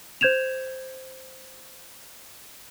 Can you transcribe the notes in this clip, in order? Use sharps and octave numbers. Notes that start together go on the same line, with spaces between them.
C5 G6 G#6 E7 F7